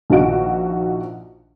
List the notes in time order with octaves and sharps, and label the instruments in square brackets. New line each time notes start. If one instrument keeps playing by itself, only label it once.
[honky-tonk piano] A#1 D#3 F3 F#4 D7